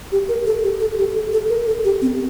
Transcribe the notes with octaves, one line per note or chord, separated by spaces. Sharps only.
G4
A#4
A4
G4
A4
G4
A4
A4
A#4
A4
G4
C4